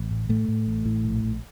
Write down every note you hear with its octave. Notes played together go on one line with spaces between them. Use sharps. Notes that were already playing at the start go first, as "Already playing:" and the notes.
Already playing: A1
A2
A2 A3
A2
A1
A2
A#1
A#1